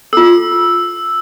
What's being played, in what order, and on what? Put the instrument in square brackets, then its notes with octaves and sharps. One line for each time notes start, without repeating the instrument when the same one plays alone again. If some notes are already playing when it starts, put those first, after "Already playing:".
[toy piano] F4 A4 [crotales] E6